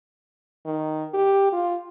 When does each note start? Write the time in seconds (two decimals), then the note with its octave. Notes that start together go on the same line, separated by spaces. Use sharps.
0.66 D#3
1.14 G4
1.53 F4